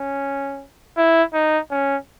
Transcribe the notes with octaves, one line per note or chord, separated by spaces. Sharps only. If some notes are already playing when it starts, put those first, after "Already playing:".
Already playing: C#4
E4
D#4
C#4